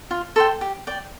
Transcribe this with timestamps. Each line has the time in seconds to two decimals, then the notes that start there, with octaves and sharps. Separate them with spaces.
0.11 F4
0.36 A4 C5 G5
0.61 G4
0.87 D5 G5